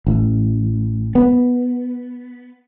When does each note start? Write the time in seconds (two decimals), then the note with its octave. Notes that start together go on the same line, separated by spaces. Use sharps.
0.07 A1
1.15 B3